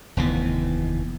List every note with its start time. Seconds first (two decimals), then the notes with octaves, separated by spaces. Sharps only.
0.17 F1 D#2 E3 B3